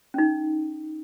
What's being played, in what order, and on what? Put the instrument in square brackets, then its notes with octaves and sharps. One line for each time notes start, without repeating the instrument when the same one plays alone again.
[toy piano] C#4 D#4